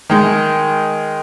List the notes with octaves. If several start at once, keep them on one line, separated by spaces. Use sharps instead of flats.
D#3 G#3